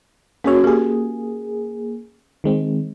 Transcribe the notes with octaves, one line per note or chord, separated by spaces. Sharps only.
A#3 C#4 F#4 G#4 C#5
A#3 G4 G#4
D#3 G#3 C4